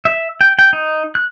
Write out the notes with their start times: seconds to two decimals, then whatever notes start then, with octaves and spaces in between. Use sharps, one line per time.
0.05 E5
0.41 G5
0.59 G5
0.73 D#4
1.15 F#6